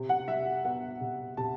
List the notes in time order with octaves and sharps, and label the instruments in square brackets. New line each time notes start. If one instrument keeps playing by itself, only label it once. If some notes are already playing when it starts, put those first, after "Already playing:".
Already playing: [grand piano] C3
F#5
G3 E5
B3 F#5
C3
C3 A5